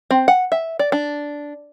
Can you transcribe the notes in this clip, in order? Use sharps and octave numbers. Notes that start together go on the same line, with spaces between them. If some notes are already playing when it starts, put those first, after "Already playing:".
C4
F#5
E5
D5
D4